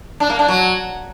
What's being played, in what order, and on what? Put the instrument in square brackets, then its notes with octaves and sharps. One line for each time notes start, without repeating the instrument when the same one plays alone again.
[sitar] D4
A#3
D4
F#3